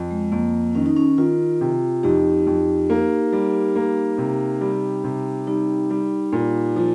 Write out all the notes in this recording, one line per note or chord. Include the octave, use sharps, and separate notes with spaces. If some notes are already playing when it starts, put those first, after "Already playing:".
Already playing: F2
G#3
F2 A#3
D#3 C#4
D#4
C#4
D#3 F4
C3
F2 D#4 G4
F2
A#3
G3
A#3
C3
G3
C3
G3 D#4
G3
A#2
F3